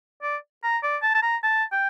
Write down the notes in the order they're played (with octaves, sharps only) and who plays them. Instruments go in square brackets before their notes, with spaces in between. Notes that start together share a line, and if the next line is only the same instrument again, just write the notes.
[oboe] D5
A#5
D5
A5
A5
A#5
A5
G5